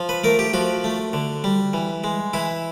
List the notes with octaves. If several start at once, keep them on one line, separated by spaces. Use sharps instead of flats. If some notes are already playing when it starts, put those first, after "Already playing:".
Already playing: F3
B4
A3 A#4
G4
F3 F#4
A3
D3
G3
E3
G#3
E3 E4